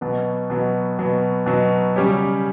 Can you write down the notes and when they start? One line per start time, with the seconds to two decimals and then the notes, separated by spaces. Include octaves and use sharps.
0.01 B2 F#3 B3
0.50 B2 F#3 B3
0.99 B2 F#3 B3
1.46 B2 F#3 B3
1.96 C#3 G3 C#4 G4 C#5